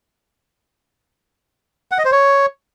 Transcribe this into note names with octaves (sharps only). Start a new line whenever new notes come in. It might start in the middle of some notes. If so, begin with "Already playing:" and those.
F#5
D#5
C5
C#5